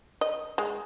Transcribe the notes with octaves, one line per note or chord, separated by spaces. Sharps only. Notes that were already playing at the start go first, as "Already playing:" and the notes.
D#5
G#3